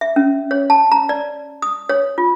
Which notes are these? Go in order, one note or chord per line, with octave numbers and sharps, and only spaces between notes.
E5
C#4
C#5
A5
A#5
D5
D#6
C#5
F4